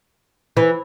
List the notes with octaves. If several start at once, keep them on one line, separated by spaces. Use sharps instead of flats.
E3